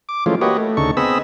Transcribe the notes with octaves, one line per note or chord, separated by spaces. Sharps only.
D6
E3 F3 G#3 A3 C#4 F4
A#3 F#4 G4 B4 C#5 D#5
A3
D2 C#3 D#4 A4 C#6
B3 C4 G#4 D#5 B5 E6